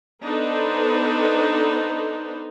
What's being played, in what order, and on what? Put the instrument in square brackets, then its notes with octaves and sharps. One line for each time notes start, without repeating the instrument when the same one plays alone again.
[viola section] B3 D4 D#4 A4 B4 C5